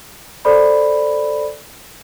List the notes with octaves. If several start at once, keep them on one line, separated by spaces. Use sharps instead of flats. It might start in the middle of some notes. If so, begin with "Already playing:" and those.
A4 C5 D5 B5